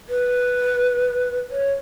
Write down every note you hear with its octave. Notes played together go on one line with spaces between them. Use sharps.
B4
C#5